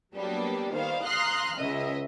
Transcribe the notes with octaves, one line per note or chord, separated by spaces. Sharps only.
F#3 G3 A#3 B3 D4 G4
D#3 G3 C5 F5
F5 A#5 C6 D#6 F6 F#6
C#2 C#3 D#5 E5